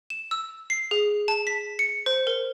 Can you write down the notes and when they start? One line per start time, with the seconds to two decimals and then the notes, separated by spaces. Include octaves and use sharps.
0.10 E7
0.31 E6
0.70 C7
0.91 G#4
1.28 A5
1.47 B6
1.79 C#7
2.06 C5
2.27 A#4